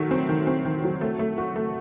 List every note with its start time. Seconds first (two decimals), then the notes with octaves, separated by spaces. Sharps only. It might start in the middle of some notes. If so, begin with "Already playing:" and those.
Already playing: D#3 F#3 A3
0.11 C4
0.29 D#3
0.47 C4
0.65 D#3
0.84 F#3
1.01 A3
1.19 A3
1.38 F#4
1.56 A3